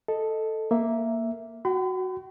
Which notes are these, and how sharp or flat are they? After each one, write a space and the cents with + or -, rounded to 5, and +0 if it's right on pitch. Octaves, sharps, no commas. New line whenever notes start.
A4 +0 D#5 +0
A#3 +0 E5 +0
F#4 +0 G5 -40 B5 +45